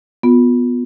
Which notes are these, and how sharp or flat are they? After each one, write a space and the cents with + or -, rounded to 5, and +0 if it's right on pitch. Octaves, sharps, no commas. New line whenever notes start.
B3 +0 F4 +30